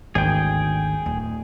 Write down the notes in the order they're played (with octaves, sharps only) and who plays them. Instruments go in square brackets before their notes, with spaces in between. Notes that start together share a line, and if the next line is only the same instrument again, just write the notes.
[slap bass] G#1 D2 [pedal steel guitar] G#4 G5
[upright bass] D1